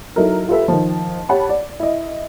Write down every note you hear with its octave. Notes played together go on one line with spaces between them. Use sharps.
F#3 D#4 E4 A4 A#4
F4 G4 A4 B4 E5
D#3 F3
G4 C#5 F#5 A5 B5
D5
E4 D#5